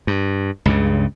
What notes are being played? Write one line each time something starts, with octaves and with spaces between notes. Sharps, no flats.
G2
C#2 G2 C#3